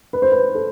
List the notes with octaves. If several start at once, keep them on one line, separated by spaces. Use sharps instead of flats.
B4
C5
B4
A4